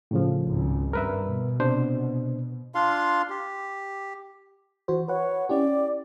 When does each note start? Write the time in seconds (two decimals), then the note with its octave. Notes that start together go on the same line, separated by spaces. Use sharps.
0.11 A2 C#3 F3
0.46 G#1 C#2
0.93 G2 A#4 B4 E5
1.26 B2
1.60 C3 D4 C5
2.75 D4 F4 F5 C6
3.30 G4
4.88 E3 F#4 C5
5.08 B4 C#5 F#5
5.49 C#4 E4 G4 D5